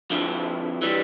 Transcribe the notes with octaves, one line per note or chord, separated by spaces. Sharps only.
F2 D3 F3 E4
E3 G3